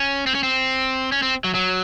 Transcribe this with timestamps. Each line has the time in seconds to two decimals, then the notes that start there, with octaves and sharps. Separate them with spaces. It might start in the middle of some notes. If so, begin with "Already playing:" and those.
Already playing: C#4
0.27 C4
0.35 C#4
0.43 C4
1.12 C#4
1.23 C4
1.44 F#3
1.55 F#3